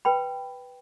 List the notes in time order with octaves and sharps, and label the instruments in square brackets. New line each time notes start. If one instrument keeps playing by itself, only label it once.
[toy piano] B4 G5 B5